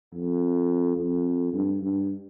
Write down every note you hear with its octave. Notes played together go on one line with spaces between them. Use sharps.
F2
F2
G2
G2